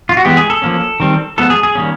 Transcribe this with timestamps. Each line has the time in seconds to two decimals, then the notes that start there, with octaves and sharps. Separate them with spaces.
0.09 F4
0.17 F#4
0.25 E3 G#3 B3 G4
0.37 G#4
0.50 A4
0.62 F3 A#3 C#4
1.00 D#3 G3 C4
1.38 F3 G#3 B3 A4
1.50 G#4
1.63 G#4
1.75 D#3 G3 A#3 C#4